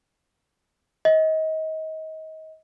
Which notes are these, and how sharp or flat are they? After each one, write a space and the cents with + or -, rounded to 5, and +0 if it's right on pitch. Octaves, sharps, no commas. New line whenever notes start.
D#5 +30